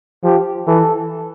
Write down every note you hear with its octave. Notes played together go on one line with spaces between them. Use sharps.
F3 G4
E3 A4